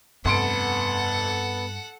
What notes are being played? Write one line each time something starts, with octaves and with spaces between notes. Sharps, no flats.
F1 G2 B3 A4 F#5 C6 D7